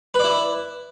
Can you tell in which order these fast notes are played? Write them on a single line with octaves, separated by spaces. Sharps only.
B4 D5 E4